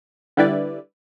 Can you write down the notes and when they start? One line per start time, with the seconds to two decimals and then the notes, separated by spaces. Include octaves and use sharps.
0.37 D3 G3 E4 B4 D5